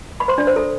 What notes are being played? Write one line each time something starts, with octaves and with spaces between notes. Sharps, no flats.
B5
C5 C6
D4 D5
C5
A4